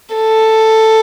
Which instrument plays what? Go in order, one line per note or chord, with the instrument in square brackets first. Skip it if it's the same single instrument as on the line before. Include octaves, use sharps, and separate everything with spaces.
[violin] A4